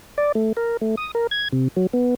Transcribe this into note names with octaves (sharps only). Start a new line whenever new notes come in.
D5
A3
A#4
A3
D#6
A#4
G#6
C3
F#3
B3